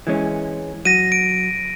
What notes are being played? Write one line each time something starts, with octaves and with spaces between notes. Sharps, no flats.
E3 G#3 C#4
F#3 A#6 D#7
D7